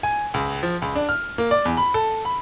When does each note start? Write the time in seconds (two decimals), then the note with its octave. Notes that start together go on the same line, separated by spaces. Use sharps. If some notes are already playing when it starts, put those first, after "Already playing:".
0.03 G#5
0.34 C#2
0.63 F3
0.82 C#2
0.95 D4
1.09 F6
1.38 A#3
1.51 D5
1.65 E2
1.77 B5
1.94 A4
2.25 B5